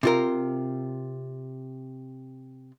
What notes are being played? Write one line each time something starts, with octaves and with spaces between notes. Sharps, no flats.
C3 F4 A#4